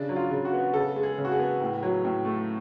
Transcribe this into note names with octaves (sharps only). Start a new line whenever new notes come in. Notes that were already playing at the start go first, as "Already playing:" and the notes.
Already playing: C#3 D4
F#3
F4
C#3
F#4
B3
C#3 A4
G#3
G#4
C#3
F#4
G#4
B3
A2
F#3
A2
A3